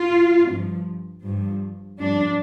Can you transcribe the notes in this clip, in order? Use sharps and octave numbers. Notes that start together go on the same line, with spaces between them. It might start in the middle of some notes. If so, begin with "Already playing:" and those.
Already playing: F4
G2 F3
G2 F3
G2 F3 D4